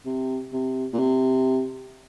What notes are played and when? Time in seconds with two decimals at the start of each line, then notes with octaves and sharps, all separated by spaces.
0.06 C3
0.53 C3
0.93 A#2
0.99 C3